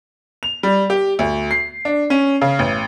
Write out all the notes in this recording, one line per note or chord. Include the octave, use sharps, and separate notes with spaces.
F7
G3
G4
D2
C7
D4
C#4
C#3
A1